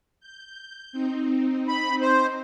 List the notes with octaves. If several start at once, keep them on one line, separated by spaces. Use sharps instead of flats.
G6
C4 D#4
B5
C5